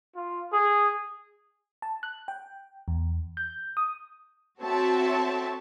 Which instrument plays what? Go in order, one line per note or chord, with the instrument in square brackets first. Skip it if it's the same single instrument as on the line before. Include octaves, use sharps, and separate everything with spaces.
[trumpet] F4
G#4
[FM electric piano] A5
F#6
G5
E2
G6
D#6
[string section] C4 F#4 A4 C#5 E5 A5